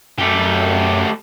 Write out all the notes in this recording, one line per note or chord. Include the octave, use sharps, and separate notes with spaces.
F#2 A3 G4